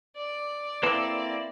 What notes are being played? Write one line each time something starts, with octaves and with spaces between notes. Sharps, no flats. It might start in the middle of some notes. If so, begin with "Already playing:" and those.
D5
A#3 C4 E4 A4 B4 D6